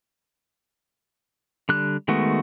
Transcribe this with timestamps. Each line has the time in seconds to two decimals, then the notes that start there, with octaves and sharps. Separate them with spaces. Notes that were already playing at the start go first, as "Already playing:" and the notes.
1.69 D3 G3 F#6
2.08 D#3 G#3 A3 B3 F#4